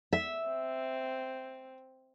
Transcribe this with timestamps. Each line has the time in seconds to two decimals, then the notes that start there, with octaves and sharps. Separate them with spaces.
0.13 E5
0.47 C4